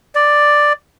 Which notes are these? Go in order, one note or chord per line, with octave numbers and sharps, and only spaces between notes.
D5